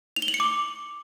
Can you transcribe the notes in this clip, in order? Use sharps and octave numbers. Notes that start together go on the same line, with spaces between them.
F7
G7
F#7
C#7
D6